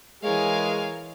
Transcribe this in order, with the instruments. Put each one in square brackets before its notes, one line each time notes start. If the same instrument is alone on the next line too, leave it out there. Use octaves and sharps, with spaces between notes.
[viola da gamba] E3 A#4 C#5 [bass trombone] G#3 [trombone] G#4 [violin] F5 G#5